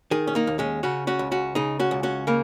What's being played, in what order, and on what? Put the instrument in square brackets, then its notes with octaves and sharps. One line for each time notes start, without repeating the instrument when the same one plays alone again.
[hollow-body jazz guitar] D#3 D#4 G#4
C#4
A#3 D#4
D#2
G#3 C#4
C#3 C#4 F#4
C#4 F#4
C#2
C#4 F#4
C#3 D#4 G#4
C#4 F#4
C#2
C#4 F#4
C#3 A#3